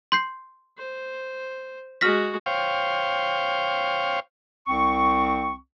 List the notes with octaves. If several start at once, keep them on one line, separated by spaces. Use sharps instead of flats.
C6 G6 C7
C5
G#3 F#4 F6 A#6 B6
C5 C#5 F5 G5
C2 C4 C#6